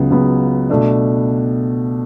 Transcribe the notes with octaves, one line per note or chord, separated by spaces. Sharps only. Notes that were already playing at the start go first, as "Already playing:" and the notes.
Already playing: C#2 C#3 F#3 B3
C#2 C#3 F#3 B3
B2 A3 D4